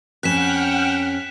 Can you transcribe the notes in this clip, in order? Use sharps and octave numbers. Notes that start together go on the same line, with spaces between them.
F2 C#4 F#5 G5 F6 F#6 B6 E7